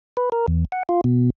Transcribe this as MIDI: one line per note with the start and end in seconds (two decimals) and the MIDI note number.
0.17 0.29 71
0.32 0.46 70
0.48 0.65 40
0.72 0.83 78
0.89 1.01 65
1.04 1.30 47